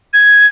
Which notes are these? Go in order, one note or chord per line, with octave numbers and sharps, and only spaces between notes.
G#6